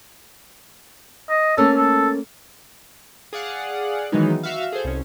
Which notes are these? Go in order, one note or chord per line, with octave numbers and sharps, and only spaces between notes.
D#5
A3 A#3 C#4 A4
A4
G#4 D5 F5 F#5
D#3 E3 F#3 G#3 B3 D#4
F#4 E5 F5
G#4 A4 C5
C2 C#4